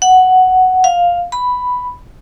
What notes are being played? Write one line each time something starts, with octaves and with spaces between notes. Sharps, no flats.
F#5
F5
B5